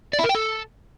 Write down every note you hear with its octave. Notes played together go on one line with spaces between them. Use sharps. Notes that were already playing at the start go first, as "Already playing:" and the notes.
D5
E4
A#4
G5
A4